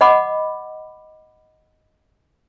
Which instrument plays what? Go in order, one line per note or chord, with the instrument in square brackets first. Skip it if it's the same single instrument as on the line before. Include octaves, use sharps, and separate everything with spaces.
[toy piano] D#5 F#5 B5 D6